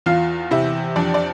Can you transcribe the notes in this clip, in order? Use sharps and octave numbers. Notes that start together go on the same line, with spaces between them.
E2 F4 F5
C3 E4 E5
F2 D4 D5
D5